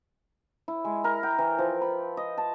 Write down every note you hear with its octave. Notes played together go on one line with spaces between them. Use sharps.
E4
G#3
A#4
G5
E3
F3
B5
D#5
A5